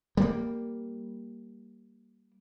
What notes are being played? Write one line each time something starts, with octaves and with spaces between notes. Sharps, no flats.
G3 A#3